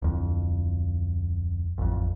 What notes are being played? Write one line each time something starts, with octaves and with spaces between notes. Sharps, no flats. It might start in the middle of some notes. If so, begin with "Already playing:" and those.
D1 F2
A1 F2